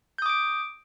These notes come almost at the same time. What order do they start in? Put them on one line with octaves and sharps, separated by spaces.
G6 D#6 D6 D7